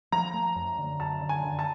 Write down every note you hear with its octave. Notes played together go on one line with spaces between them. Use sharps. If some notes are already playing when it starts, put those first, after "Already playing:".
F3 A#5
A3
F#2
D3
F#2 A5
D3
G#5
D3
A5